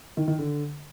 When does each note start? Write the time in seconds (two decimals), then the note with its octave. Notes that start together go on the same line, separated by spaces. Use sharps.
0.17 D#3
0.28 D#3
0.39 D3